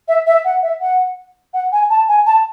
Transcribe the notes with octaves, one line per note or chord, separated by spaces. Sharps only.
E5
E5
F#5
E5
F#5
F#5
G#5
A5
G#5
A5